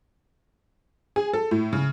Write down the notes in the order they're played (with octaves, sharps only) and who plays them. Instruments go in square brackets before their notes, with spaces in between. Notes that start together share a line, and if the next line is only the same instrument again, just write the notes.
[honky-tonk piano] G#4
A4
A2
C#3